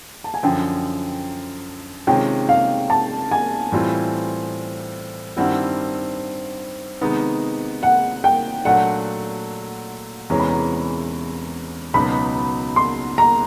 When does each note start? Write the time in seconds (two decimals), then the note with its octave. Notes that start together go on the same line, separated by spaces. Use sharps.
0.24 A5
0.34 G#5
0.43 F#2 D3 F3 G5
2.07 C3 D#3 G#3 C#4 F4 G5
2.49 F5
2.90 A5
3.31 G#5
3.72 A2 E3 G3 C4 F4
5.37 G2 D#3 G3 C4 E4 F#5
7.01 C3 D#3 G#3 B3 D#4
7.83 F#5
8.24 G5
8.65 A#2 F#3 A3 D4 F#5
10.30 E2 C3 E3 G#3 C#4 A#5
10.39 B5
10.50 A#5
11.94 C#2 B2 F#3 B3 D#4 B5
12.76 C6
13.18 A#5